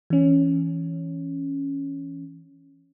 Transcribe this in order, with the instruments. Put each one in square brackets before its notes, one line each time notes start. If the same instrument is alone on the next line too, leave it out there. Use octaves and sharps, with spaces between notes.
[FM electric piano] E3 C#4